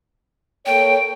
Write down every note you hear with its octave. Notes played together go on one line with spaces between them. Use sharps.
A#3 A4 C#5 G5